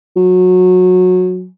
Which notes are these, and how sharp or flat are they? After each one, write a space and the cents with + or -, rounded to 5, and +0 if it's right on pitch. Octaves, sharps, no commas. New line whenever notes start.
F#3 -20